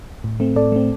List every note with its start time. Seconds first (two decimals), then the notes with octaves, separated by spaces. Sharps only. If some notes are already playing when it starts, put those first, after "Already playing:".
0.24 A2
0.40 A3 C4
0.56 A2 A4 D5
0.72 A3 C4